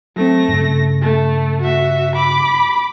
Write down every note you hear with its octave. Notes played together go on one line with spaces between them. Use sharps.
F#3 A3 C4 A#6
G2 C#3
A3
F#4 E5
B5 D6